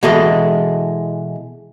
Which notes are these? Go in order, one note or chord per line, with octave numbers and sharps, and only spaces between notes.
B2 E3 G#3 A4 D#5